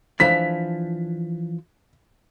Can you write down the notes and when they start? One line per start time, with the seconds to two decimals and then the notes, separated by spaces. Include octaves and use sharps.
0.20 E3 F3 D4 B6